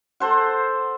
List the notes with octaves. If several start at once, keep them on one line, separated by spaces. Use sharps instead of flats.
A4 C5 F#5